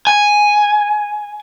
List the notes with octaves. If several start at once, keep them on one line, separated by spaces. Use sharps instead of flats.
G#5